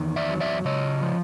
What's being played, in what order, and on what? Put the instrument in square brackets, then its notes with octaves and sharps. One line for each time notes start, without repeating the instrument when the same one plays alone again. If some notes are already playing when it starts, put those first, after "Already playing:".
Already playing: [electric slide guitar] E2 D#3
D5 E5
F#3
D5 E5
C#3 C#5 D#5
F3